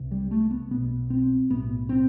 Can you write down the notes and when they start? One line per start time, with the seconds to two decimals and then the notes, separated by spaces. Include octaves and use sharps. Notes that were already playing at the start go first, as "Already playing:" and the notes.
Already playing: C2 C3
0.11 G3
0.31 A3
0.51 B3
0.71 B1 B2 B3
1.10 C4
1.50 B1 A2 B3
1.89 C4